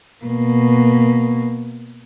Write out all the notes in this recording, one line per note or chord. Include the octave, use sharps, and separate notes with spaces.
B2 A#3